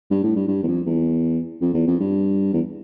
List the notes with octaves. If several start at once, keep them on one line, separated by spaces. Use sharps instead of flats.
G2
A2
G2
G2
E2
F2
E2
F2
E2
F2
G2
E2